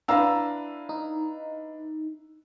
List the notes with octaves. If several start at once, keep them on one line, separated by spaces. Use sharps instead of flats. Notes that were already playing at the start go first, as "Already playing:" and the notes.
D4 E4 B4 F5 A#5 E6
D#4